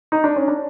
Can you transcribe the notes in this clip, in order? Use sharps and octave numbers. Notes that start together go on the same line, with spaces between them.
D#4
D4
C#4
D4